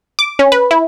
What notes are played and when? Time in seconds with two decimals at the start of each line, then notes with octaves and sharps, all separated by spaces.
0.19 D6
0.39 C#4
0.52 B4
0.71 E4